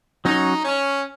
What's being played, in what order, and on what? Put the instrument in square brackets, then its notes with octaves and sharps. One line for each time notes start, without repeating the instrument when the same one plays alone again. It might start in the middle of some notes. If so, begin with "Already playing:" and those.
[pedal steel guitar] F#3 C#4 F#4 C#5 [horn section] D#4
[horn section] C#4